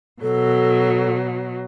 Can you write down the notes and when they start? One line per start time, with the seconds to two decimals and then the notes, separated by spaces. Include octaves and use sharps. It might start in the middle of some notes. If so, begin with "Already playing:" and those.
0.22 B2 F#3 A4